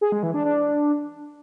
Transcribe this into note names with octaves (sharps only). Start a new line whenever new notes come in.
G#4
G#3
E3
D4
D4